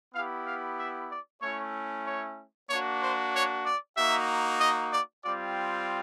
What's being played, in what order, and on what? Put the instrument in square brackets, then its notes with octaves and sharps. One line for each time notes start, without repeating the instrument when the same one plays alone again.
[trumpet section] B3 E4 G4 F5
F5
E5
D5
A3 C#4 E4 C#5
C#5
A#3 D4 F#4 C#5
C5
C#5
D5
A#3 D#4 F#4 E5
D#5
D5
G3 C4 F4 D5